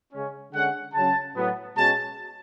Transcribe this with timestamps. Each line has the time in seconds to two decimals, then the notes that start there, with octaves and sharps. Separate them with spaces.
0.13 C#3 G#3 C#4
0.53 D3 G#3 C#4 F#5
0.94 C#3 F#3 C#4 A5
1.36 A2 F#3 B3
1.77 B2 G#3 C#4 A5